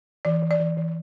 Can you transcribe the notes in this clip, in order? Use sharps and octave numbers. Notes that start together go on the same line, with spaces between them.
E3 D5
E3
D5
E3
E3